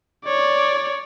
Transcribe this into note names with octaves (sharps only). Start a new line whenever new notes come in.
C#5 D5